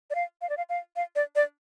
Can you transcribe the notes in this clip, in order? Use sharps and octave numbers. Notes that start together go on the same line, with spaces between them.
D5
F5
F5
D5
F5
F5
F5
D5
D5